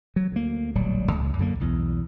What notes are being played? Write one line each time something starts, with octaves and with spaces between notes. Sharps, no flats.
F#3
D2 A#3
D1 A#1 F#3 G3
C#2
F#2 D3 A#3
B1 E2